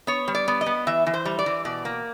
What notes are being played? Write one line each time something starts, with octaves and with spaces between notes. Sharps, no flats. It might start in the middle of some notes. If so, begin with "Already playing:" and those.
B3 C#5
G3
D5
B3
D#5
B3
E3 E5
E3
C5
G3
D5
E3
B2 D5
A#3